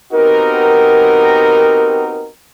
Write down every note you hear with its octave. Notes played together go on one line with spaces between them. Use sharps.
B3 C4 D#4 F#4 G4 A#4